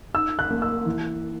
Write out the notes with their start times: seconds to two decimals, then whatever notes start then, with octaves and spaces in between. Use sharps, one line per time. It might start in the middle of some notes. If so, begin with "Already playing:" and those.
0.14 D#4 E6
0.39 F#6
0.50 A#3
0.62 E6
0.86 E3